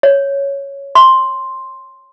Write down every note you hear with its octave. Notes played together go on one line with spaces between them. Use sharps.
C#5
C6